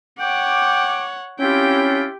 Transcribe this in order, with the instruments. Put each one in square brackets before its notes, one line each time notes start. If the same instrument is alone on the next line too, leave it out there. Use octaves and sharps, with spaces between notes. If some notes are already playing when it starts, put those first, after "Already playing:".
[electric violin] C#5 F#5 [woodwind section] G5 D6
[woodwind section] C4 E4 F4 [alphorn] C#4 [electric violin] G4 G5